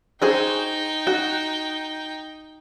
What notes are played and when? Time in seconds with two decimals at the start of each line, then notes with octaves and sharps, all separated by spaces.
0.22 D#4 F#4 G#4 C5 G5
1.07 F#4